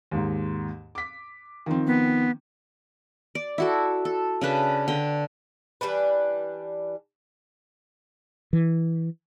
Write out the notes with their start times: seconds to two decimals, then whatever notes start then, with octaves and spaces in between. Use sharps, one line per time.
0.11 D#2 G#2
0.95 D6 B6
1.66 D#3 F3 C4
1.87 B3
3.35 D5
3.58 E4 F#4 A4
4.05 A4
4.41 C#3 D4 B4 A5
4.88 D3 G5
5.81 E3 G3 D4 B4
8.53 E3